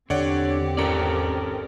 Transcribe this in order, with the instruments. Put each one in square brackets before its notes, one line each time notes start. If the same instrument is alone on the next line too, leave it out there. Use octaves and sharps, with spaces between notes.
[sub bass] E2 [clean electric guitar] D3 [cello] C4 G4 [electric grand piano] C#5 D5 F#5
[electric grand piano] G#1 C#4 C#7 [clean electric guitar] A4 A#4 D5